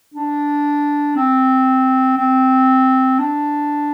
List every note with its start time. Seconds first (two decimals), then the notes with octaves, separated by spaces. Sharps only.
0.14 D4
1.16 C4
2.18 C4
3.19 D4